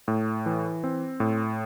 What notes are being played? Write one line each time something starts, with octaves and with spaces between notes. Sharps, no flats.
A2
E3
C4
A2